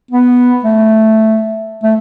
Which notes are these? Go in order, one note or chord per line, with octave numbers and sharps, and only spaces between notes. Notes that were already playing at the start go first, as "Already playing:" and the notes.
B3
A3
A3